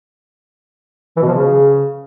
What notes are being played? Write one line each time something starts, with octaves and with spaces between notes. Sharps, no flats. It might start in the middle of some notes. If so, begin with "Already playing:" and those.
E3
B2
F3
C#3